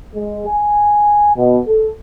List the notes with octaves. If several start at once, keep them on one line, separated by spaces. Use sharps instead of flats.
G#3
G#5
B2
A4